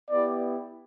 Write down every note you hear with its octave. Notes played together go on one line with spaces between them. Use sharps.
B3 E4 G4 D5